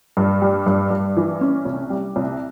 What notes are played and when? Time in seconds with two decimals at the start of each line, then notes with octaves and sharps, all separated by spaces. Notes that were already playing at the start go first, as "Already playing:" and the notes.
0.17 G2
0.42 G3
0.66 G2
0.91 G2
1.17 E3
1.41 C#4
1.65 C2
1.90 G3
2.16 C2